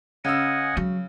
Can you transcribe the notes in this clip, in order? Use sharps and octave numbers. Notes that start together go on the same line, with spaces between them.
C#3 D#5 F#5 G#5 E6
F#3